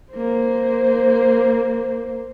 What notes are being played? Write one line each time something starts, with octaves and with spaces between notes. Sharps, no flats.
A#3 C5